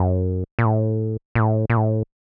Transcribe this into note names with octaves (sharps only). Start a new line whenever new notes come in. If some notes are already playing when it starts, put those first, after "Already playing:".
Already playing: F#2
A#2
A2
A#2
A2
A#2
A2